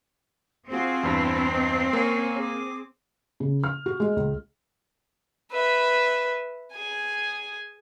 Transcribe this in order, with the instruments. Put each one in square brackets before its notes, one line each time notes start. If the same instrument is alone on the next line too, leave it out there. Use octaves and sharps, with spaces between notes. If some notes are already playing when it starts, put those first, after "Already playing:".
[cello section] C4 [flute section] F4 F#4 G#4
[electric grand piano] E2 G2 [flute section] E4 A5
[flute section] D#4
[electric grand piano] A#3 [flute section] C#4 C#5 G#5
[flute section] G#4 D6
[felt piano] C#3
F6
F#4
G#3
C#2
[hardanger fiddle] B4 E5
G#4 G#5